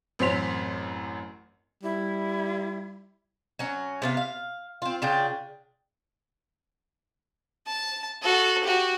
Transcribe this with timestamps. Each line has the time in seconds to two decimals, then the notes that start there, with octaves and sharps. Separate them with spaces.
0.19 A1 F#2 C4 C6 B6 F7
1.83 G3 E4
3.59 F#3 C#4
4.02 C3 B3 F5
4.17 F5
4.82 C4 F4
5.02 C#3 D4 F4 G5
7.67 A5
8.22 F#4 A4
8.64 F#4 G4